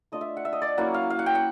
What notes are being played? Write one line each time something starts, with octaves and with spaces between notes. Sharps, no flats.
A3 D4 F4 D#5
E5
F#5
E5
D#5
D5
F#3 A#3 C#4 E4 F#5
F5
F5
F#5
G5
F#5